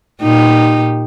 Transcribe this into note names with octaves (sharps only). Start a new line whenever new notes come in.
A#2 D#4 G4